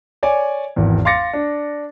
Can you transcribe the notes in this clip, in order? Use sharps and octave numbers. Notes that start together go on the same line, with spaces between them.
C#5 D5 G#5
G#1 E2
F5 C6 D6 A6 A#6 C#7
D4